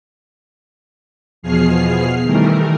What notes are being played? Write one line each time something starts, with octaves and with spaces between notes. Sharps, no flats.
E2 B2 F3 G#4 F6 C7
D#3 E3 G3 A3 A#4